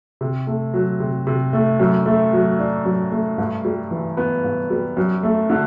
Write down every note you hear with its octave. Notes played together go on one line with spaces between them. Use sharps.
C3
A3
F#3
C3
C3
A3
F#2
A3
F#3
D4
F#2
A3
G2
G3
E3
B3
G2
G3
F#2
A3
D3